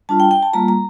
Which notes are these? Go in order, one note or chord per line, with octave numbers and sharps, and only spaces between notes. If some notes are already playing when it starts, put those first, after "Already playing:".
G3 D4 F4 A5
G5
G5
A5
G3 A#3 F4 A#5
A#5